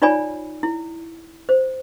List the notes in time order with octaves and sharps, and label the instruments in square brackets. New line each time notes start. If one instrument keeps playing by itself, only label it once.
[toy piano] D#4 F4 C#5 D5 G#5 B5
E4
C5